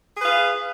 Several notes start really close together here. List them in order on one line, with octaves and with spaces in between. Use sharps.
G#4 B4 F5